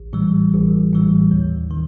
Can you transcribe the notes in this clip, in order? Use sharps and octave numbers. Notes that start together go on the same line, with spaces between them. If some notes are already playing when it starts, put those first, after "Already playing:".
Already playing: A1
A2 E3 G3
A1
A2 E3 G3
D#2
D#3